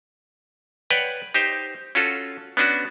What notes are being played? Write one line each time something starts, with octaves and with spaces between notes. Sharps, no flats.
B4 C#5 D5 F#5 G5
D#4 G4 C5
C#4 F4 F#4 A4
B3 C#4 D4 F#4